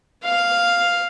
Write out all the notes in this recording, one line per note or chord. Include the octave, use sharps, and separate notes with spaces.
F5